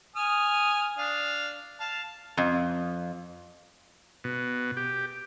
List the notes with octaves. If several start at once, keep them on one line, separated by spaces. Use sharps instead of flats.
G#5 D#6 F6
D4 F5
F5 A5
F2
B2
G4